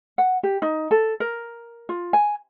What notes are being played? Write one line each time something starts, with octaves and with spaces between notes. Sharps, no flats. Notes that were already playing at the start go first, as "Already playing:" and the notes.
F#5
G4
D#4
A4
A#4
F4
G#5